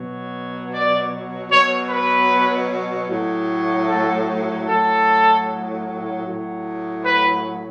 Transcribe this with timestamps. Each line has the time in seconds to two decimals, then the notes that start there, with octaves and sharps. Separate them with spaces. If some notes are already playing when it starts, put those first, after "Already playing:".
Already playing: B2 F#3
0.72 D5
1.50 B2 F#3 C#5
1.90 B4
3.08 A2 F#3
3.88 A4
4.66 A2 F#3 A4
6.25 A2 F#3
7.04 B4